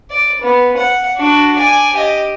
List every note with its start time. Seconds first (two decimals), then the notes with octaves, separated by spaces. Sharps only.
0.10 D5
0.41 B3
0.77 F#5
1.17 D4 F#4
1.56 D5 G#5
1.93 G4 D#5